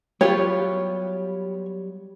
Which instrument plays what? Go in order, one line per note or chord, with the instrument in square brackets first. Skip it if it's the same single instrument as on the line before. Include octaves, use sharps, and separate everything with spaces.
[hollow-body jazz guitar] F#3 G3 [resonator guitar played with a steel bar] B3 F4 G4 [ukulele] C#5